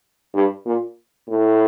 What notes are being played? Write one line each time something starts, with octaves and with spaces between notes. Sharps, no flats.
G2
A#2
A2